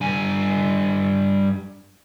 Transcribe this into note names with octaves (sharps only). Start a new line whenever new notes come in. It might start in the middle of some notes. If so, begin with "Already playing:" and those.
G2 G#5